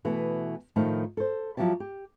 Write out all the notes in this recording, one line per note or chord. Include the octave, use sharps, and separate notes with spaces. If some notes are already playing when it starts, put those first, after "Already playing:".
B2 E3 A3 B3
A2 D#3 F3 A3 D#4
A4 C5
F3 F#3 E4 G4 A5
G4